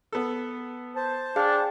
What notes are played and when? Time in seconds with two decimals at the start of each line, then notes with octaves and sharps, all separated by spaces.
0.13 B3 A4
0.96 C5 A5
1.36 D4 G#4 F5 G5